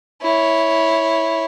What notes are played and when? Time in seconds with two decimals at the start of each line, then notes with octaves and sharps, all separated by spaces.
0.22 E4 C#5